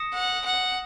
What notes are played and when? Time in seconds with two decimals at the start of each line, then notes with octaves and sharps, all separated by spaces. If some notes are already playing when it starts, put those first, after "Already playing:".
Already playing: D#6 A#6 C#7 E7
0.13 F#5
0.46 F#5